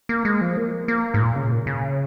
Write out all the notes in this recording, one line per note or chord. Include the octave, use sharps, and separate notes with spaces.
A#3
G#3
F3
A#3
A#3
G#2
A#2
C#3
A#2
C#3